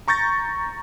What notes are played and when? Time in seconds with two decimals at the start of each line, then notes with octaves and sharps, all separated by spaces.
0.08 A#5 C#6 G6 A6 A#6